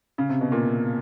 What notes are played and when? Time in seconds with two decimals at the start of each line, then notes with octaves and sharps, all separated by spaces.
0.18 C#3
0.29 C3
0.41 B2
0.52 A#2